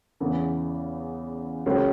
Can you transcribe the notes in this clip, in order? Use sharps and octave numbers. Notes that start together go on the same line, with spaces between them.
E2 C#3 E3 B3
C#2 C#3 F#3 A#3 C#4